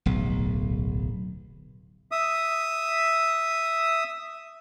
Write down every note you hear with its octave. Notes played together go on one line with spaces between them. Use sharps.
D1 B1
E5 D#6